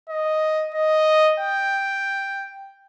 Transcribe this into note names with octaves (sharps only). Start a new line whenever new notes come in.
D#5
D#5
G5